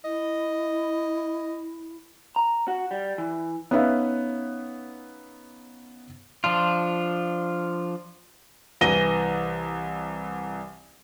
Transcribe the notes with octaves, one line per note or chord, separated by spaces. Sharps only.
E4 D#5
A#5
F#4
G3
E3
B3 C#4 D#4 B4 E5 F5
F3 D4 F4
C2 E3 A#6 D#7 G7